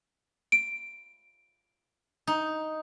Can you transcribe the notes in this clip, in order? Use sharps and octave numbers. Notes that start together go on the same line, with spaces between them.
D7
D#4